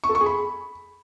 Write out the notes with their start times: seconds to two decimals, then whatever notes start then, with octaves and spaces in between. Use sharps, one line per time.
0.04 C#6
0.09 A4
0.15 C#6
0.21 G#4
0.26 B5